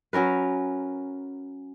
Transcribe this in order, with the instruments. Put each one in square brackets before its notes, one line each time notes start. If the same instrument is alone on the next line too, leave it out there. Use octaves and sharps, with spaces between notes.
[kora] F#3 C#4 A#4 B4